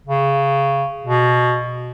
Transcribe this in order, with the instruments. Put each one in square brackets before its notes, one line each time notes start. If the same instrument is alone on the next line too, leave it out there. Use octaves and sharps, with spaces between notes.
[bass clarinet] C#3
B2